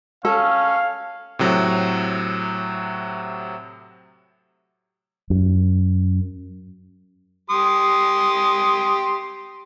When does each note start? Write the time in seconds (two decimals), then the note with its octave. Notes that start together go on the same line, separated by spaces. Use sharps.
0.25 C#4 A4 F5
1.39 A2 C3 F#3
5.30 F#2
7.50 G4 C6 D#6